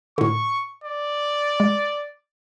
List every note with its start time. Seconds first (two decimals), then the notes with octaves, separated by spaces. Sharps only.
0.18 A2 D3 C#6
0.84 D5
1.60 G#3